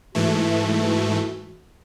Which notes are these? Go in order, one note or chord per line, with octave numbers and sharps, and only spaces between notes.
G#2 E3 A3 F#4